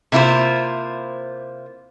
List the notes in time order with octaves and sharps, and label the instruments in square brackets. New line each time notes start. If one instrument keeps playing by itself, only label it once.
[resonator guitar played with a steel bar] C3 A#3 E4 F4 C5